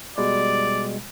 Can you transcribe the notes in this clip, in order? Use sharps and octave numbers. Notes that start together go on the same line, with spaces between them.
B2 G3 G#3 D5